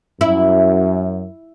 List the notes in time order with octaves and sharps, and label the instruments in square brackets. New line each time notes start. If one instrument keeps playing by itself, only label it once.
[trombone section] F#2 [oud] E4